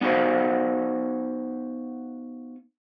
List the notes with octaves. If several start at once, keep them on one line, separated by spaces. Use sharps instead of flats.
B3 D#4 F#4 C5 F5